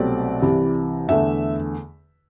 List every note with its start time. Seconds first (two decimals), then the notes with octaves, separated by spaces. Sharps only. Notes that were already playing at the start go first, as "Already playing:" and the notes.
Already playing: C2 B2 F#3 A3 C4 D5
0.42 C2 C3 E3
1.08 E2 D3 A3 E5